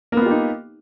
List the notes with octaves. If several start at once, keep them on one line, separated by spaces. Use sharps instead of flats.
A#3 B3 D#4 F4 G4